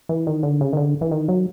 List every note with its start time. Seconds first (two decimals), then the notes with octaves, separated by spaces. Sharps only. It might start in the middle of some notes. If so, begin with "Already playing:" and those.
0.09 E3
0.27 D#3
0.43 D3
0.61 C#3
0.73 D#3
0.77 D3
1.01 E3
1.11 D#3
1.28 F#3